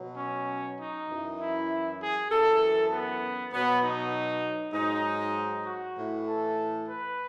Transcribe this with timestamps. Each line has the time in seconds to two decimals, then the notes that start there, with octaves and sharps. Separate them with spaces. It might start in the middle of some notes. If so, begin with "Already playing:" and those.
Already playing: B2 F#3
0.17 C#4
0.78 D#4
1.09 F#2 E3
1.39 E4
2.00 G#4
2.30 F#2 E3 A4
2.90 B3
3.51 B2 F#3 B3
3.82 D#4
4.73 G#2 F#3 D#4
5.65 F#4
5.95 A2 E3
6.26 A4
6.87 B4